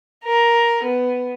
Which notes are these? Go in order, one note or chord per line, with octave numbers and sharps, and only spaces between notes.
A#4
B3